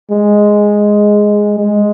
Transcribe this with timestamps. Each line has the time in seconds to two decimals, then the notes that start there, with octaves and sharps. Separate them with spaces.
0.11 G#3
1.58 G#3